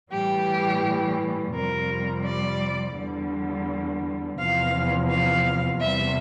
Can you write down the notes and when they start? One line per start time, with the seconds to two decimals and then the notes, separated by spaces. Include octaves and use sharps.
0.11 A2 E3 G3 G4
1.54 F2 C3 G3 A#4
2.25 D5
2.96 E2 D3 G3
4.38 E2 C3 F3 F5
5.09 F5
5.80 E2 C3 G3 E5